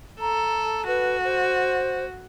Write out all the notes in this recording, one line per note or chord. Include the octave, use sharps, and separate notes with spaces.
A4 A#5
F#4 B4
C5